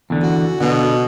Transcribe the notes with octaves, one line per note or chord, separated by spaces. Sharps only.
E2 D3
F#4
B2 D3